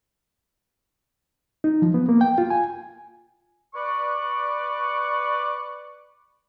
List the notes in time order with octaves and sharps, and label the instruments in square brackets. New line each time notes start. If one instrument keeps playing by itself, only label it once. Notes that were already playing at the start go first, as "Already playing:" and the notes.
[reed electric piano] D#4
F3
B3
A#3
G5
F4
G#5
[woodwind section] B4 D5 C#6